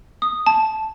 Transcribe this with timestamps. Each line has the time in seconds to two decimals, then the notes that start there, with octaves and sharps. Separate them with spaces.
0.22 D#6
0.46 A5